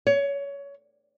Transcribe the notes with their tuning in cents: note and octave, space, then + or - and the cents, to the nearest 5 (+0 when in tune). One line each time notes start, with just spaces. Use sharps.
C#5 +20